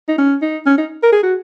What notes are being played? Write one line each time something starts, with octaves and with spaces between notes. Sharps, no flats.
D#4
C#4
D#4
C#4
D#4
A#4
G#4
F#4